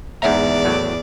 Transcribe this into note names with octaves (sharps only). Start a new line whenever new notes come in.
E2 G#2 D5 E5 F#5 A#5
A2 F#3